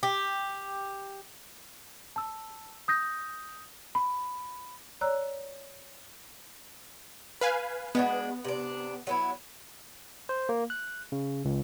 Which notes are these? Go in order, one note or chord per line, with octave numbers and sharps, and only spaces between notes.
G4
A5 E6
D#6 G6 A#6
B5
C#5 D5 A#5 E6 F#6
B4 F5 G#5
G#3 B3 D4 F#4
C3 D4
F#3 B3 E4
C5
A#3
F#6
C#3
C#2